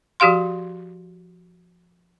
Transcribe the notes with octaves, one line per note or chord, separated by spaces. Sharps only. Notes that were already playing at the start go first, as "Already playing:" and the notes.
F3 F#4 G4 F5 C6